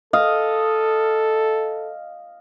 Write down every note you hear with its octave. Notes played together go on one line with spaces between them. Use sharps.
A4 D#5 F5